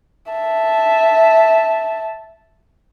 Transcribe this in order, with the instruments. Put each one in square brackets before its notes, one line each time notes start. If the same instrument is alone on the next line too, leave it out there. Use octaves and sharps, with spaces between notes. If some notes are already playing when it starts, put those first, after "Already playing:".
[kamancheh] E5 A5